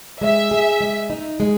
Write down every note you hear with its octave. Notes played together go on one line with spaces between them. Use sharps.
G#3 E5
G#4
G#3
D#4
G#3